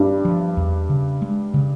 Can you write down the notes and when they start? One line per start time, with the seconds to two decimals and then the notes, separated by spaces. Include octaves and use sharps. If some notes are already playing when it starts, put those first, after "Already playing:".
Already playing: G2 G3
0.25 F3
0.57 E2
0.90 C#3
1.22 G#3
1.54 C#3